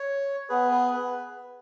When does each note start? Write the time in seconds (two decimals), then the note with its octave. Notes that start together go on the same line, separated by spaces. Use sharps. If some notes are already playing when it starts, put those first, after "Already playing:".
Already playing: C#5
0.49 B3 G#4 B4
0.71 B4
0.94 B4